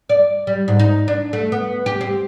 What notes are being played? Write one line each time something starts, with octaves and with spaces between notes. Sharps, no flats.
D5
G3
G#2
D#4
D4
A3
B3
G4
C4